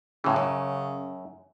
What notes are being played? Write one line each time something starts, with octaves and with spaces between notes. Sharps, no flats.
A2 C#3 E3
F#2